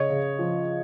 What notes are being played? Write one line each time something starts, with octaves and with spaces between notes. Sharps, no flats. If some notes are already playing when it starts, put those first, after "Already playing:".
Already playing: C#3 C#5 D#5
C#3
F3